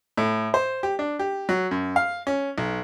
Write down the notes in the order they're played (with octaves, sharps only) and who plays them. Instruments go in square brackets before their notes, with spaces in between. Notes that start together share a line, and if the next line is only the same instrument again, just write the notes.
[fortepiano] A2
C5
G4
D4
G4
F#3
F#2
F5
C#4
B1